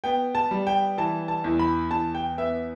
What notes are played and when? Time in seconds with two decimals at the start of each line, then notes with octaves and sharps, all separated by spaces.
0.04 B3 G5
0.35 A5
0.51 G3
0.67 G5
0.98 E3 A5
1.28 A5
1.44 E2
1.59 B5
1.91 E2 A5
2.15 G5
2.37 B3 E5